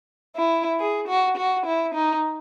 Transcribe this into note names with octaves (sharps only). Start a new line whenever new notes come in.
E4
G#4
F#4
F#4
E4
D#4